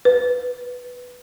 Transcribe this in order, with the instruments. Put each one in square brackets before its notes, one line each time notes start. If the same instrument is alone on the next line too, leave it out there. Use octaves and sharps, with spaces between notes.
[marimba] B4